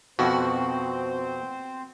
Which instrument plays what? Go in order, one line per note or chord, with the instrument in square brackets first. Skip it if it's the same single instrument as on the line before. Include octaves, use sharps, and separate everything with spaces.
[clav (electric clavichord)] F2 B2 [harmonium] C4 C5 [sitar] F#4